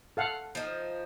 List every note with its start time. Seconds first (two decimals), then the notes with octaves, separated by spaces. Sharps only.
0.17 A4 F5 F#5
0.55 F3 D#4